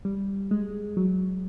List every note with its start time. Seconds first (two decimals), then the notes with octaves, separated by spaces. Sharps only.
0.05 G3
0.51 G#3
0.97 F#3